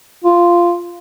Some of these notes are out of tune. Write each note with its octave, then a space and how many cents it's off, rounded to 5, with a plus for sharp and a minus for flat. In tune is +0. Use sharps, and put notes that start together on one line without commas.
F4 -10